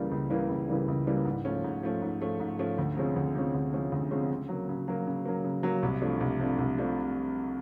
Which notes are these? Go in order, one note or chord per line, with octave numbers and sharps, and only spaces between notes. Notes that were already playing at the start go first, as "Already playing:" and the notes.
Already playing: C#2 C#3 E3 G3 A#3
C#2
C#3 E3 G3 A#3
C#2
C#3 E3 G3 A#3
C#2
C#3 E3 G3 A#3
G#2
F3 A3 C#4
G#2
F3 A3 C#4
G#2
F3 A3 C#4
G#2
F3 A3 C#4
D2
C3 F3 G#3 C#4
D2
C3 F3 G#3 C#4
D2
C3 F3 G#3 C#4
D2
C3 F3 G#3 C#4
C#3
F#3 A#3
C#3
F#3 A#3
C#3
F#3 A#3
C#3
F#3 A#3
C2
C3 F3 A3 D4
C2
C3 F3 A3 D4
C2
C3 F3 A3 D4